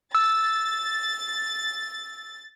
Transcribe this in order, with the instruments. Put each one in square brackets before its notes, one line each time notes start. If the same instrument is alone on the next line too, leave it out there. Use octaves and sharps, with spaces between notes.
[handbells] E6 [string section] A6